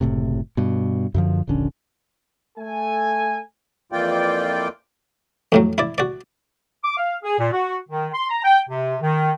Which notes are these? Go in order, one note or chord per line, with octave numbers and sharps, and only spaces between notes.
F#1 A2 C3
G2 B2
F#2 D3 F3
D#1 A#1 D3 C#4
A3 A4 G#5
F2 E3 A#3 F4 D5 G5
F2 A2 F#3
E4 D5
F#4 D5
D6
F5
G#4
A#2
F#4
D#3
C6
A#5
G5
C3
D#3